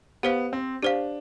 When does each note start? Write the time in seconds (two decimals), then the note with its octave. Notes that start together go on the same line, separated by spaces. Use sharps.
0.23 B3 G4 C5 F5
0.53 C4
0.83 D4 G4 C5 F5